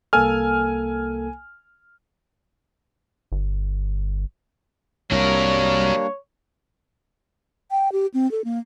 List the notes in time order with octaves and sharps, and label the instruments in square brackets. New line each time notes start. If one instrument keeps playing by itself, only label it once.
[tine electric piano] C2 A#3 A4 [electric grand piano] G#5 F6
[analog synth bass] G1
[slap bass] C2 [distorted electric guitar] F#3 A#4 [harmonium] G3 A#3 D4 [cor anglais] C#5
[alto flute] G5
G4
C4
A4
A#3